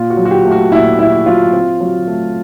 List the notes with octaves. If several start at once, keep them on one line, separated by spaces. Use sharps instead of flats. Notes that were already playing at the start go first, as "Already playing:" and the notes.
Already playing: A#2 F4
F#4
F#3
F#4
G4
A3
F#4
A#2 E4
A#2 E4
F#3 F4
C4
F#3
A3